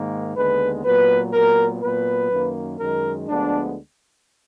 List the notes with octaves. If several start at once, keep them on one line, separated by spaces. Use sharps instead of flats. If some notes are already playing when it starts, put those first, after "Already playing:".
Already playing: G#2 D#3 A#3
D#2 D3 G#3 B3 B4
A#2 F#3 B3 B4
A#2 F#3 B3 A#4
A#2 F#3 B3 B4
F#2 D#3 A#3
F#2 D#3 G#3 A#4
D2 D3 F3 G#3 B3 D4